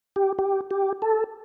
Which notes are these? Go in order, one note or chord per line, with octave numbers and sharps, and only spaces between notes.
G4
G4
G4
A4